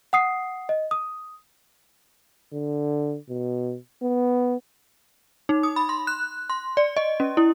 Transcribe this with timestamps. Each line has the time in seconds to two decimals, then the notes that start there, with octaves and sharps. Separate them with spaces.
0.13 F#5 D#6 C7
0.69 D#5
0.91 D#6
2.53 D3
3.29 B2
4.02 B3
5.49 D#4
5.63 D#6
5.76 B5
5.89 C6
6.07 F#6
6.50 C6
6.77 D5
6.97 D#5
7.20 C#4
7.37 E4